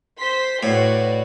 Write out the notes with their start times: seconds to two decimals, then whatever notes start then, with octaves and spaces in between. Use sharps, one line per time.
0.19 C5 C6 B6
0.63 A2 F#4 B4 D5